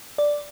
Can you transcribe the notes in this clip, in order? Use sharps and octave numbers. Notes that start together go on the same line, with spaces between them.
D5